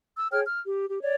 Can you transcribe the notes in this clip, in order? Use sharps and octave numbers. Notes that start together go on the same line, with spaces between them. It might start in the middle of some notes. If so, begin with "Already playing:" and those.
E6
G#4 C#5 G5 F6
F6
G4
G4
C#5 D5